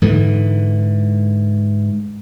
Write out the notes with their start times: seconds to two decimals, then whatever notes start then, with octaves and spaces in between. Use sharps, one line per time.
0.02 G#2 D3 E3